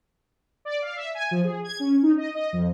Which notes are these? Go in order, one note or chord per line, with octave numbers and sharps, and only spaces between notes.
D5
F5
E5
G#5
F3
G#4
G#6
C#4
D#4
D#5
D#5
F2